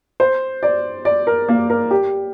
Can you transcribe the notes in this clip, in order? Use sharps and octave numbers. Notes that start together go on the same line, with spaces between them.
C5
D5
D5
A#4
A#3
A#4
G4